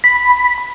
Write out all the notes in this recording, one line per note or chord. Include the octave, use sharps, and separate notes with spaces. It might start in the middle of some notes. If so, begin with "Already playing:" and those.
B5